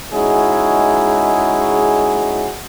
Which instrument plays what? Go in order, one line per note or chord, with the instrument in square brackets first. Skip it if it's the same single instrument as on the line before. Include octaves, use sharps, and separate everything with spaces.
[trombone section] G#3 C#4 D#4 E4 F#4 G#4